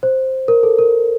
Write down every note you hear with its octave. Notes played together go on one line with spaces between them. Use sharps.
C5
A#4
A4
A#4